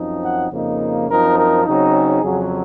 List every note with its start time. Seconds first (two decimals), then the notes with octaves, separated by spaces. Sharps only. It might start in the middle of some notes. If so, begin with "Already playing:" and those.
Already playing: F#2 F3 C4 D#4
0.22 F#5
0.50 F2 C#3 F3 A#3 D#4
1.08 F#2 F3 C4 D#4 A#4
1.37 A#4
1.65 C#3 F#3 C4 D#4
1.94 G#4
2.23 F2 C#3 F#3